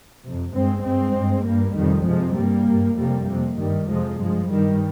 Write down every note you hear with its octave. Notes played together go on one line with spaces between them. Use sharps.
F2 C3
G2 G#3 C4
G2 G#3 C4
G2
G2 G3 A#3
F2 C3 D#3 G3
F2 C3 F3 G#3
G2 G3 A#3
G2
F2 C3 G3 A#3
F2 C3
G2 D#3 G3
F2 C3 F3 G#3
G2 F3 G#3
G2 D#3 G3